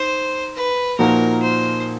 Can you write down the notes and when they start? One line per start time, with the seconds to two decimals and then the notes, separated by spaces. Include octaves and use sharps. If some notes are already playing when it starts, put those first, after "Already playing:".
Already playing: D#4 C5
0.56 B4
0.98 A#2 F3 A#3 D#4 F#4 A#4
1.42 C5